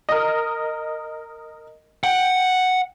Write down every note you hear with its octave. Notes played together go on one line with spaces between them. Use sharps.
A#4 D#5
F#5 G5